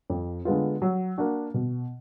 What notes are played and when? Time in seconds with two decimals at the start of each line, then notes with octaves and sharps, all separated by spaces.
0.10 F2
0.45 D3 G#3 B3 F4
0.82 F#3
1.18 A#3 D4 F#4
1.54 B2